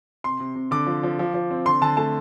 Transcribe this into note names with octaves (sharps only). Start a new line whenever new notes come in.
C3 C6
C3
C3
D3 D6
F3
F3
F3
F3
C4
D3 C6
D3 A5
A3 A5